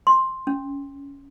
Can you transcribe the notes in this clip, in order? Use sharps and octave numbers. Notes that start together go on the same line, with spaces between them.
C6
C#4